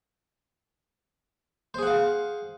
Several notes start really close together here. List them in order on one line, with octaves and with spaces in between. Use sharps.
C5 G#4 F#5 F5